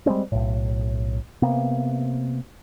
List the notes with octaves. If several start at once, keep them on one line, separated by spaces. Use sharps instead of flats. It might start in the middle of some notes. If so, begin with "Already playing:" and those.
G3 G#3 C4 C#4
B1 A2
C3 A#3 B3